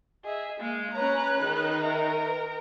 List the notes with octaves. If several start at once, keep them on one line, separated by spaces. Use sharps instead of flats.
G#4 D#5 E5
G#3 A#3 F5
C#4 B4 C#5 A#5 F#6
D#3 D#4 G#4
A#4 E5 A#5
B4